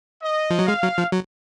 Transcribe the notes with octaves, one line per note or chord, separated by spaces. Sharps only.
D#5
F3
F#3
G#3 F5
F#3
F3
F#3